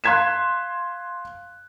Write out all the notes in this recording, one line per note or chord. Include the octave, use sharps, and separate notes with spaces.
F5 C6 F#6 G#6 B6 E7